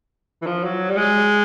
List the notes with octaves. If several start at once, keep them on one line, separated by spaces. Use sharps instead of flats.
E3
F3
F#3
G3
G#3